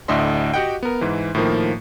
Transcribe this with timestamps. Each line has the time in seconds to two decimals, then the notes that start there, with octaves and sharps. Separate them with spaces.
0.08 D2 A2 D4 D#5 E5 C6
0.54 F#4 G4 D#5 F#5 G5
0.83 B3 A#4
1.01 G#2 E3
1.35 A2 D#3 F3 A#3